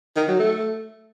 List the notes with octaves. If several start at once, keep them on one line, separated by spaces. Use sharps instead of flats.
D#3
F#3
A3